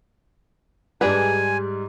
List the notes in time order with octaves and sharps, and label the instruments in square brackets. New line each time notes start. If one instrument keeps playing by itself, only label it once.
[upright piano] G#2 G3 [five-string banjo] D4 G#4 B4 [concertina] G#5